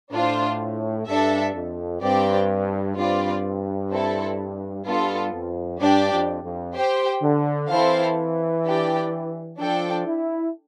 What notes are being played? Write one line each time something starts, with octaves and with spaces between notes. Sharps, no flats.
A2 D4 F4 C5
G2 D4 A4 E5
F2
G2 C4 G4 D5 G5
G2 C4 F4 B4 D5
C4 E4 A4
G2 B3 F4 A4
F2
G2 D4 G4 D5 G5
F2
F2
G4 C5 G5
D3
E3 C4 E4 A4 C5 F5
D4 G4 D5 G5
F3 D4 A4 D5 G5
E4